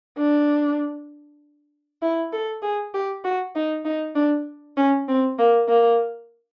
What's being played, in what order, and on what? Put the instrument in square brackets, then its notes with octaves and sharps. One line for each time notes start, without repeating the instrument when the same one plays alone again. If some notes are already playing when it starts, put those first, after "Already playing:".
[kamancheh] D4
E4
A4
G#4
G4
F#4
D#4
D#4
D4
C#4
C4
A#3
A#3